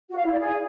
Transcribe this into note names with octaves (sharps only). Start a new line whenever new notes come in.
F#4
F5
E4
D5
G#4